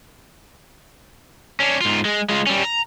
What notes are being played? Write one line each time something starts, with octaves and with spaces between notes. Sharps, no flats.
C#4 D4
G#2 F4
G#3
G#3 F4
G3 C#4
A#5